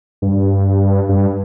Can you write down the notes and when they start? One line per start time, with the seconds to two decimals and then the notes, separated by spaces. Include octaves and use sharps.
0.22 G2
1.09 G2